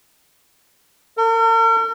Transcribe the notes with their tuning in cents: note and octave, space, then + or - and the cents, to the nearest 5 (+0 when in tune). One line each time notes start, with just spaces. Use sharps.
A#4 -45